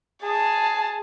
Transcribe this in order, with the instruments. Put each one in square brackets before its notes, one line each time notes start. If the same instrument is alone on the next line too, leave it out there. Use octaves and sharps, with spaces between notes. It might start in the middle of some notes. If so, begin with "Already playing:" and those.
[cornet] G#4 [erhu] A5